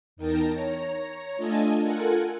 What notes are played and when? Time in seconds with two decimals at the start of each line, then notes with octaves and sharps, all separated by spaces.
0.16 E2 D#4 A#4 G5 A5 A#6
0.52 C#5 A#5
1.37 A3 D4 F4 A4 D#5 G#5
1.81 F4 A4 A#4 F#5 G#5